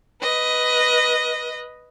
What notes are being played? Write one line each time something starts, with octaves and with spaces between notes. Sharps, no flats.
B4 D#5